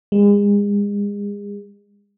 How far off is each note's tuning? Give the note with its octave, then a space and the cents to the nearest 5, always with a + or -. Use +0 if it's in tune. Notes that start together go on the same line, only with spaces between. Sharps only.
G#3 -35